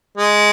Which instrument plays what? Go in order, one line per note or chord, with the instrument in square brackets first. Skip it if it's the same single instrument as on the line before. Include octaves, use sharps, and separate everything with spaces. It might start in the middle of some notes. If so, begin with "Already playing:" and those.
[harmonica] G#3